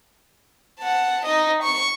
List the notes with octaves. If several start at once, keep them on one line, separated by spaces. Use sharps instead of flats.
F#5 A5
D#4 D#5
C#6